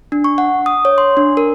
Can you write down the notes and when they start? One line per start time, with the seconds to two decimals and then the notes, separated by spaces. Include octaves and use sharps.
0.12 D4
0.24 C#6
0.38 F#5
0.66 D#6
0.85 C#5
0.98 C6
1.17 D4
1.37 A#4